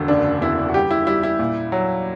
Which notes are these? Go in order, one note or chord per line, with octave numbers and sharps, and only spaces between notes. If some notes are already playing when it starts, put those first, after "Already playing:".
Already playing: E1 D3
F#1 D4
E2 E4
F#4
G3 G4
E4
G3 E4
E4
A#2
F#3